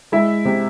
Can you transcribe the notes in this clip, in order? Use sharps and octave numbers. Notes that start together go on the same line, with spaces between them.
G#3 E4 E5
C3